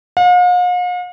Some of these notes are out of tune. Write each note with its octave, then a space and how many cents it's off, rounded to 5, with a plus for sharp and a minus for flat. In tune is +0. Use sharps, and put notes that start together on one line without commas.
F5 +45